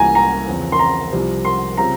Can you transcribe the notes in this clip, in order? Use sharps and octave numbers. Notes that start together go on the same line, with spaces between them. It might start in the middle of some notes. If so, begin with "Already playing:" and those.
Already playing: C2 C3 E3 A#3 F4 G#5 A#5
A#5
E2 C#3 F3 C4 F4
C6
A#5
C2 C3 F3
C6
C#3 G3 C4 F4 A#5